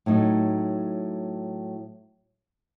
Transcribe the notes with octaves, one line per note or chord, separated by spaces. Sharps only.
A2 F#3 D#4